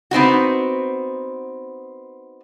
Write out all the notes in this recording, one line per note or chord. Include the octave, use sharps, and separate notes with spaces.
B3 C4 D#4 F#4